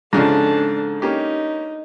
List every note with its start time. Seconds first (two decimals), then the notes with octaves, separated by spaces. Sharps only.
0.13 G#2 C#3 F3 D4 A4
1.02 A#3 C#4 D#4 G4